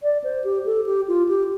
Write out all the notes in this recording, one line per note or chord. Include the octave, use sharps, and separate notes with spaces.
D5
C5
G4
A4
G4
F4
G4